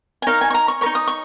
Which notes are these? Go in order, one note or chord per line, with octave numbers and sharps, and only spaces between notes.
G#5
D#4 A#4 C#5 F5
G#5
C#6
A#5
C#6
D#4 A#4 C#5 C#6
D#6
C#6